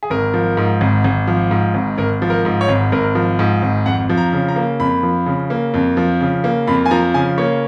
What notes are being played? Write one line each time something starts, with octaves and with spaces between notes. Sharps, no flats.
G#4
G#1 A#4
F3
G#2
G#1
G#1
F3
G#2
G#1
G#1 A#4
F3
A#4
G#2
C#5
G#1
G#1 A#4
F3
G#2
G#1
F2 F#5
F3
A#5
C#3
A#5
A#3
F2 B5
F3
C#3
A#3
F2
F3
C#3
A#3
F2 B5
G#5
F3 A#5
C#3 G#5
A#3 C#5